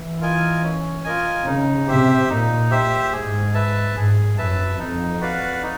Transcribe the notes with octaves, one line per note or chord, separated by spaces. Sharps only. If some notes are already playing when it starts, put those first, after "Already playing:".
Already playing: E3
F4 A#4 D#5 G#5
C#4
F4 A#4 D#5 G#5
C#3 D#4
C3 G4 C5 E5
A#2 D#4
G4 C5 E5
G#2 G#4
B4 E5 A5
G#2 G#4
F#2 B4 E5 A5
F2 D#4
F#4 B4 D5 F5
D#4